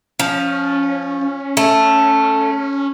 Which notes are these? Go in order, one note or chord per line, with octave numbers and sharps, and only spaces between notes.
F3 C#4
A3